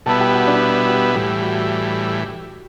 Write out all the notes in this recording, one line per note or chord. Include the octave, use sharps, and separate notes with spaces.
B2 G3 B3 E4 A4 A5
G4 G5
F#4 F#5
D4 D5
G4
A2 E3 G3 G4
F#4